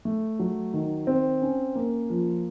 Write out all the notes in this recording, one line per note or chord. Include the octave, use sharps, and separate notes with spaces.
A3
F#3
D#3
C4
C#4
A#3
F3